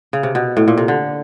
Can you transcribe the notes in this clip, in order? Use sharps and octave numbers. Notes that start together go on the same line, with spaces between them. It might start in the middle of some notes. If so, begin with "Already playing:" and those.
C#3
C3
B2
A2
A#2
C3
D3